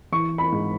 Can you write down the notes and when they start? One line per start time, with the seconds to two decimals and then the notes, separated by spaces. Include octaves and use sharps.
0.12 E3 C#6
0.38 B5
0.52 G#2